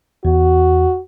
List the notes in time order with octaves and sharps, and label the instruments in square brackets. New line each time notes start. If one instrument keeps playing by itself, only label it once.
[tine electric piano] E2 [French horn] F#4